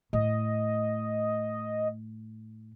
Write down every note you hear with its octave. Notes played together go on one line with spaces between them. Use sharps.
A2 D#5